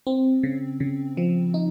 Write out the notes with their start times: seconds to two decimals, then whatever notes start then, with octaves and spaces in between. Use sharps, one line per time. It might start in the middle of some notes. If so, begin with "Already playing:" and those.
0.07 C4
0.43 C#3
0.80 C#3
1.17 F3
1.54 D#4